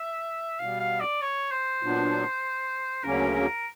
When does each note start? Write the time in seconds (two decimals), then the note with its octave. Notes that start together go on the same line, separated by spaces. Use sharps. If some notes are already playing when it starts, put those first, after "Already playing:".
Already playing: E5
0.60 B2 G3 B3 F5
0.80 F5
1.00 D5
1.22 C#5
1.51 C5
1.83 A#2 F#3 B3 D4
3.03 D2 C#3 F#3 A#3 C#4 A#4
3.34 A#4